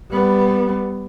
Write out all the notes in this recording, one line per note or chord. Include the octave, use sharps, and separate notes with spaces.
G3 B3